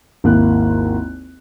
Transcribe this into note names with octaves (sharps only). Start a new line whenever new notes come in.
G#1 D#2 A#3 E4 F#6